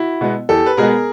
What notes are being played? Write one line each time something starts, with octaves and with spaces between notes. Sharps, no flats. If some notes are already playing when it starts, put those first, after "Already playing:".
Already playing: E4 F#4
B2 G#3 B3
E2 G4 A4
B4
B2 G#3 B3 G#4 A#4